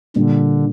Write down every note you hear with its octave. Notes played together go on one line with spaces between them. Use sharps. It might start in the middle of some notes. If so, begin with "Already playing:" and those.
A#2 D3 G3 A#3 D4